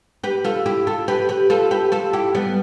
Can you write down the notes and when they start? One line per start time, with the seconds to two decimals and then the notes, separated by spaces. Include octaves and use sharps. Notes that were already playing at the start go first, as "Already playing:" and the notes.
0.24 G4 B4
0.44 F4 A4
0.66 E4 G4
0.87 F4 A4
1.08 G4 B4
1.29 G4 B4
1.50 F4 A4
1.71 G4 B4
1.92 F4 A4
2.13 E4 G4
2.35 G3 B3